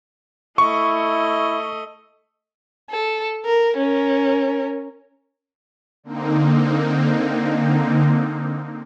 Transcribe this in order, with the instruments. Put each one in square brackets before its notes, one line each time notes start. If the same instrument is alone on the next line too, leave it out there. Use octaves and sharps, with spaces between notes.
[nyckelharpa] A3 D#5 [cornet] E4 [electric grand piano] C#6
[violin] A4
A#4
C#4 A#4
[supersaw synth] D3 A#3 C4 D#4